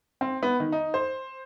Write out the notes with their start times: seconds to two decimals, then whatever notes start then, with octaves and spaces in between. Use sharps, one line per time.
0.21 C4
0.43 B3
0.60 D#3
0.72 D#4
0.94 C5